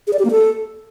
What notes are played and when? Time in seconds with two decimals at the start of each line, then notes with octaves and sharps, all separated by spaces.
0.07 G#4
0.13 D5
0.19 G4
0.25 A#3
0.31 A4